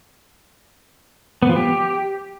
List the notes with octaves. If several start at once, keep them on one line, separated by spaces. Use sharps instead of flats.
B3
F3
G4